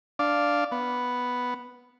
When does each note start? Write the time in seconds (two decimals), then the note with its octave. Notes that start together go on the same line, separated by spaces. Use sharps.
0.19 D4 D5 F5
0.72 B3